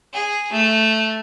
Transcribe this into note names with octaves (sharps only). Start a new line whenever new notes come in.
G#4
A3